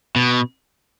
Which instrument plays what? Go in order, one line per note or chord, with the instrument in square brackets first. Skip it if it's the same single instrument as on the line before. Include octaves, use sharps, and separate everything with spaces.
[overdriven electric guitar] B2